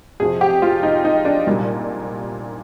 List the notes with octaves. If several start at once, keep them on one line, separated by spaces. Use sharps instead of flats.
F2 C3 F3 G#4
G4
F4
D#4
D#4
D4
C2 A#2 G3